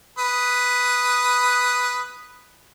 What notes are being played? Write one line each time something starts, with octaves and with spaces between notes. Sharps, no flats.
B4 D#6